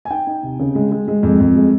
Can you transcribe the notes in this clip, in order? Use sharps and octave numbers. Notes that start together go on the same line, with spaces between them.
G#5
D#4 G5
D#4
C3
C#3
G#3
G#3
G#3
F2
F2
G#3